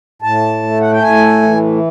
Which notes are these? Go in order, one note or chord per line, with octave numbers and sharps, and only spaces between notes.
A2 A5
A3
F#5
G5
A2 G#5
E3